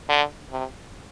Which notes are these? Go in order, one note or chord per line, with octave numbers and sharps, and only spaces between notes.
D3
C3